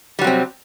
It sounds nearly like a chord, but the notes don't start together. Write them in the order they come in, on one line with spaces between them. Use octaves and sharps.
G3 F#3 C3 C4